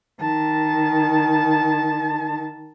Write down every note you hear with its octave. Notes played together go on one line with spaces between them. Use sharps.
D#3 A5